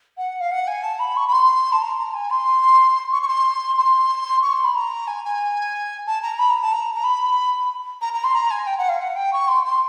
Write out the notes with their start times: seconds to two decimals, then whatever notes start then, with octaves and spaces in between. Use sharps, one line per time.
0.17 F#5
0.40 F5
0.51 F#5
0.67 G#5
0.83 A5
0.99 B5
1.17 C#6
1.27 B5
1.32 C6
1.72 A5
1.82 A#5
1.98 A#5
2.13 G#5
2.30 C6
3.12 C#6
3.22 C#6
3.28 C6
3.78 C6
4.42 C#6
4.53 C6
4.64 B5
4.74 A#5
5.07 G#5
5.24 G#5
6.06 A5
6.22 A#5
6.39 B5
6.50 A#5
6.62 A5
6.73 A#5
6.95 A#5
7.04 B5
8.01 A#5
8.13 A#5
8.24 C6
8.34 A#5
8.50 G#5
8.66 G5
8.78 F#5
8.89 F5
8.99 F#5
9.16 G5
9.33 C#6
9.48 C6
9.64 C6